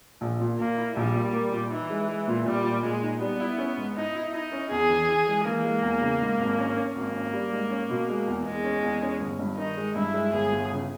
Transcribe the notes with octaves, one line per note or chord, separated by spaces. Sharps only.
A#1
A#2
A#2 A#3
E4
A#1 G3
A#2
A#3
A#2
E3 D#4
G#3
G#3
A#2
A#2 G3
A#2
A#2 G#3
D#4
G3 B3
E4
C#4
G#2
D#4 E4
E4
D#4 E4
C#4
E2 G#4
E3
E3
G#3
E3 A#3
G#3
E2
C#3
G#2
G#1
C#4
C#4
G#1 A#3
C#4
G3
G#2
C#4
B2
G#3
E2
E2 G#3
C#4
E2
C#4
G1
G2
D#3 D#4
G#3
G2 E4
G#3
G1 G#4
G1
C#3